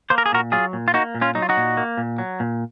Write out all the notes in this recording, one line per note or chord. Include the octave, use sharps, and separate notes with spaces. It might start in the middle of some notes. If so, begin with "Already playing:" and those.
A#3 C5
A#4
G#4
A#2 F#4 A#4
F#3 F4 G#4
A#2
F4
A#3 D#4 F#4
A#2
C#4 F4
F#3 D#4
F4
D#4 F#4
A#2
A#3
A#2
F#3
A#2